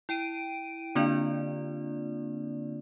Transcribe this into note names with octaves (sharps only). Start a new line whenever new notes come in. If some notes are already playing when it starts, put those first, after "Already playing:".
E4 G5 D7 D#7
D3 A#3 C4 D4 F4 D5